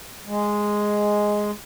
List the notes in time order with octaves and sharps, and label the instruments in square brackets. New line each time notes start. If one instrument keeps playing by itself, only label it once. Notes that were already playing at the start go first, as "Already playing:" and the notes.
[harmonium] G#3